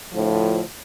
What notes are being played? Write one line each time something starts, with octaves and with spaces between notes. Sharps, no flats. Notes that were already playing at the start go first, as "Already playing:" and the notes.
D2 A2 F3